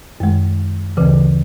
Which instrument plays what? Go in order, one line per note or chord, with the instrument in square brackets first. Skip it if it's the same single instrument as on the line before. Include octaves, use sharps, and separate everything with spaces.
[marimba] F#2 D#3 G#3
D2 C#3 E3